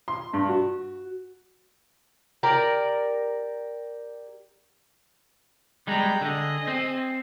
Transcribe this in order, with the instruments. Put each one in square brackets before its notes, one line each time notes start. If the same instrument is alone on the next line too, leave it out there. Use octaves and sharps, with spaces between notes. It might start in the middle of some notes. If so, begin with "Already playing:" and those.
[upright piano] C6
G2
F#4
[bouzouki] G4 A#4 D5
[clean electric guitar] G3 G#3 [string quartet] G5 A#5 G6
[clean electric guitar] D3 [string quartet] G#4 D#5
[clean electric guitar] C4